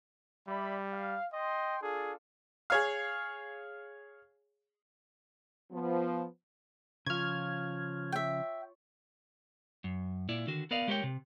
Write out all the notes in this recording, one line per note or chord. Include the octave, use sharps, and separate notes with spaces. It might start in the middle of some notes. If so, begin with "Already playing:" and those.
G3 D5 E5 B5
F5
D#5 G5 C6
D4 F4 G#4 A4
G#4 C#5 F5
F3 B3
C#3 F3 F4 C#5 F6 G#6
E5 G5
F#2
A#2 E4 D5
D3 D#3 F#4
B3 A#4 D5 D#5 F5
G#3 G4 A#4 C5 C#5 G5
C3